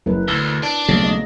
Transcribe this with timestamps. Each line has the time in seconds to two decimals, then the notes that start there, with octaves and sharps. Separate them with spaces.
0.06 F#1 E4 A#4 B4
0.28 D2 E6
0.63 D4
0.89 B1 C#3 A3 A#3 C#5
1.03 G#3 D#5